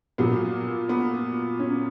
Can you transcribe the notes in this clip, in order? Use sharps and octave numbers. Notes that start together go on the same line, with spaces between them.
A#2 F#3 B3
B3
C#4